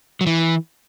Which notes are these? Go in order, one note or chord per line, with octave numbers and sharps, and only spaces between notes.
F#3
E3